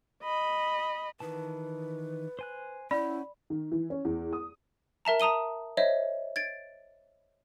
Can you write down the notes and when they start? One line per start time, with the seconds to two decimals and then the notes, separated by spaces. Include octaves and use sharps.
0.24 D#5 B5
1.20 D#3 E3 B4 A5
2.39 C5 G#5 F#6
2.91 C#4 E4 D5 F#5 B5 G6
3.50 D#3
3.72 E3
3.90 C#4
4.05 E2
4.33 D#6
5.05 A#4 E5 A5 A#5
5.20 A5 A#5 D#6 D#7 G7
5.77 C5 C#5 D#5 E5
6.36 G#6 A6 D7